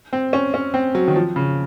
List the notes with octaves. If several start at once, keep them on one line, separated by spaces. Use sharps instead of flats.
C4
C#4
C#4
C4
F#3
D#3
F3
C#3